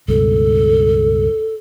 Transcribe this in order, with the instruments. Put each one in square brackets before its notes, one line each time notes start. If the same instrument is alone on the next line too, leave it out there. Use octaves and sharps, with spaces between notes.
[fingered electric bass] C#2 G2 B2 [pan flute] A4